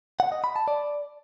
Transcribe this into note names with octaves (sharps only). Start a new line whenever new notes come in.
F#5
D#5
B5
A5
D5